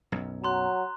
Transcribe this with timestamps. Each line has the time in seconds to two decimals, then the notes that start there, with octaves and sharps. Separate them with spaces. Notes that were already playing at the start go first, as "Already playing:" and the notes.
0.12 B1 F#2
0.44 F#3 A#5 C6 F#6